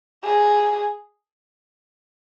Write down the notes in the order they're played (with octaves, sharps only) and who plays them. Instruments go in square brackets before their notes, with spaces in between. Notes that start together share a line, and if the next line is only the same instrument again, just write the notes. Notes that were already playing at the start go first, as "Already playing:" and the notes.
[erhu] G#4